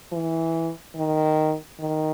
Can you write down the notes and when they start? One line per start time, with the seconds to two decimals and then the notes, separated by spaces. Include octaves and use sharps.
0.12 E3
0.95 D#3
1.80 D#3